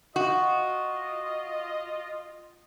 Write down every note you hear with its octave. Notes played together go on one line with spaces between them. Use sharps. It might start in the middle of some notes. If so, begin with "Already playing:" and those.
F4 F#4 D#5